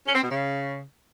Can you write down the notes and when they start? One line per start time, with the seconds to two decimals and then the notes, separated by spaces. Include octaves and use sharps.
0.07 C#4
0.15 C4
0.23 B2
0.30 C#3